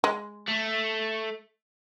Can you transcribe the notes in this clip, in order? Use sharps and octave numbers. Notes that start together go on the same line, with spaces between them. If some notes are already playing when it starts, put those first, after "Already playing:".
G#3
A3